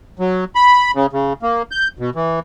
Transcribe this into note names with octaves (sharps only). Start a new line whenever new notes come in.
F#3
B5
C#3
C#3
A#3
G6
B2
E3